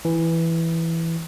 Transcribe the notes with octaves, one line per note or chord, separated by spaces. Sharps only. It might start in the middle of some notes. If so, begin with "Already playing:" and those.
E3